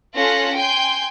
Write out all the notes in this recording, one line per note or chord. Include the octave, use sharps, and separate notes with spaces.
C#4 F4 A4 F#6 A#6
G5 G#5 C6 G6